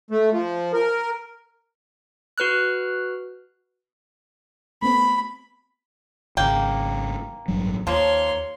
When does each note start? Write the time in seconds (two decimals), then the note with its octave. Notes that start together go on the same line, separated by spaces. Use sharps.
0.11 A3
0.31 F3
0.73 A#4
2.38 F#4 B4 F6 F#6
4.82 A3 B3 C4 B5
6.37 G#1 C#3 A#3 G5
7.48 A1 G2 F#3
7.87 D#2 F3 A#3 C#5 C6